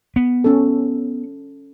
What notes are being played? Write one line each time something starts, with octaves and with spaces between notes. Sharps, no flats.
B3
C#4 A4